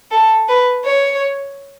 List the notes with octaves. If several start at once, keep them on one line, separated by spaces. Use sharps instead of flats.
A4
B4
C#5